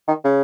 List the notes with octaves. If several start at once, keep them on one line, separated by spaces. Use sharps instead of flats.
D#3
C#3